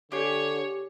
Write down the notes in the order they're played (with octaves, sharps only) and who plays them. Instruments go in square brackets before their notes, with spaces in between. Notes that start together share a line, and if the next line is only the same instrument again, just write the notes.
[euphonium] D3 [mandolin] G4 G#4 [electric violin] C#5